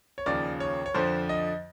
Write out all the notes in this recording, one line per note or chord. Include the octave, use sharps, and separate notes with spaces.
C#5
D#2 C#3 F3 D5
C#5
C#5
F2 D3 F3 C5
D#5